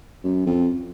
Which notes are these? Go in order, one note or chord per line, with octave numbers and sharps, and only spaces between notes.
F#2
F2